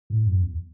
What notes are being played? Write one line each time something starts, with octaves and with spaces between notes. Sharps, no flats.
A2
F#2
E2